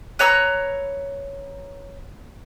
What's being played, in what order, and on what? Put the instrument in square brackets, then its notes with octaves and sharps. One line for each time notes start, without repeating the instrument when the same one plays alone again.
[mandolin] B4 C#5 A#5 E6